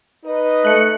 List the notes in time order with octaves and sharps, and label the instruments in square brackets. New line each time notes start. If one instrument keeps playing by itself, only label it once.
[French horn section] D#4 B4 D#5
[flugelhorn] A3 [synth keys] F#6 C#7